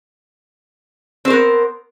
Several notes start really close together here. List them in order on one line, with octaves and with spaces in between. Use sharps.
C4 C5 A#4 B3